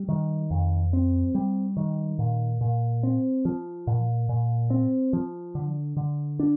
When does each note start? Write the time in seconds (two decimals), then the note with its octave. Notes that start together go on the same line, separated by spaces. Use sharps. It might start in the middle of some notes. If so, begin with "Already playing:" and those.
Already playing: G3
0.09 D#3
0.51 F2
0.93 C4
1.35 G3
1.77 D#3
2.19 A#2
2.61 A#2
3.03 C4
3.45 F3
3.87 A#2
4.29 A#2
4.70 C4
5.13 F3
5.55 D3
5.97 D3
6.39 D4